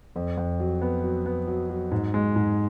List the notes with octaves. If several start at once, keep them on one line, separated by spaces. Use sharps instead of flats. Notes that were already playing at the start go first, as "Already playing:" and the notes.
F2
F2
F#3
B3
F#3
B3
F#3
F#3
G#2
G#3
G#2